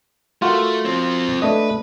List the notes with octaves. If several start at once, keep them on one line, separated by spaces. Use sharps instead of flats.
A3 F4 F#4 A#4
F3 C4
A3 D4 B4 D#5